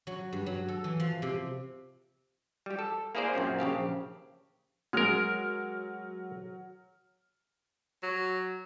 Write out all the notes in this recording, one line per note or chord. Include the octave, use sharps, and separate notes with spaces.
F#3
G2
F#3
A4
E3
F3
C3
G3 G4
A4
A#3 E4 G#4 C5 D5
F#2 A#2 C4 C#4
A#1 C#3 G4 F5
F#3 G#3 A#4 F6
F#3